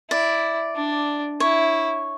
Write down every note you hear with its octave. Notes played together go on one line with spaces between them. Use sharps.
E4 D5
D4
E4 C#5